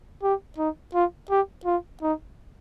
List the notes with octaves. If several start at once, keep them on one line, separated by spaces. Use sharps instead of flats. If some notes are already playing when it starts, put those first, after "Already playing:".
G4
D#4
F4
G4
F4
D#4